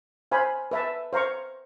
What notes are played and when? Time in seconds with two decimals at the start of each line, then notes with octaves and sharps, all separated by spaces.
0.31 C5 F5 G#5 B5
0.71 B4 E5 A5
1.13 C5 F5 A#5 C#6